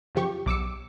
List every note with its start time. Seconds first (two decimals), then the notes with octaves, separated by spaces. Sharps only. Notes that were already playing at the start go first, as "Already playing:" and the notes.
0.15 F#2 C#3 F3 G4 C#6
0.46 B1 D6 E6 C#7